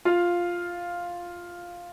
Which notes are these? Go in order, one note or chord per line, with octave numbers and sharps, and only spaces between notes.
F4 F5